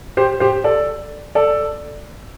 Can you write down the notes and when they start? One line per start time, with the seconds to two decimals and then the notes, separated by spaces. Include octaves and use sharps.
0.17 G4 C5
0.40 G4 C5
0.64 A4 D5
1.35 A4 D5